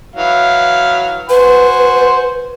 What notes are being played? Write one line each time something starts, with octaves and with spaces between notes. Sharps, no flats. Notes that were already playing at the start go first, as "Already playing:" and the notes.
E3 F#3 F5
F#4 B4 C5 G#5